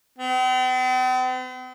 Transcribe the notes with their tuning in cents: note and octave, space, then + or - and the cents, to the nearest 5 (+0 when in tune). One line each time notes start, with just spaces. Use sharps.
C4 -45